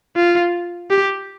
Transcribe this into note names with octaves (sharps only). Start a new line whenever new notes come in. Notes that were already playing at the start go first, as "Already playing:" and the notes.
F4
G4